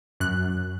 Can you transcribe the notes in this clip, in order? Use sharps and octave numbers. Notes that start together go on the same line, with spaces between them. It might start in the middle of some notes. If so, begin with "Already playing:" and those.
F#2 F#6